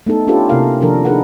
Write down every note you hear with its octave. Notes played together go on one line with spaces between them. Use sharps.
A3 B3 D#4 A4
C#4 D4 F4 G4 A4 B4
C3 A#3 E4 A#4 F5
C3 D#3 F3 D4 A4 A#4
D4 D#4 G#4 A#4 B4 F#5